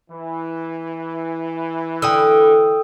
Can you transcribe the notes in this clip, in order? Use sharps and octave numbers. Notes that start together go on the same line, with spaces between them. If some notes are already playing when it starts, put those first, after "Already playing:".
E3
D3 G5 D#6 E6